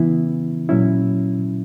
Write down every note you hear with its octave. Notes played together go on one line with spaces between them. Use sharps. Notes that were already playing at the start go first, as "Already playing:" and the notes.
Already playing: C#3 E3 B3 E4
A#2 F#3 C#4 E4